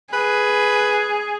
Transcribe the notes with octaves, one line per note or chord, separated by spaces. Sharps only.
G#4 B4